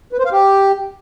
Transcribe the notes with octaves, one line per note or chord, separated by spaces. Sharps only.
B4
C5
F5
G4